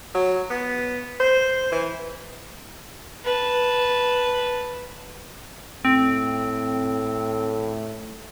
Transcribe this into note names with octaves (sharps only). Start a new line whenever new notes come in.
F#3
B3
C5
E3
B4 A5
A2 C4